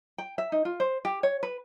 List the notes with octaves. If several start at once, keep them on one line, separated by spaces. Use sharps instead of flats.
G5
E5
D#4
F4
C5
G4
C#5
B4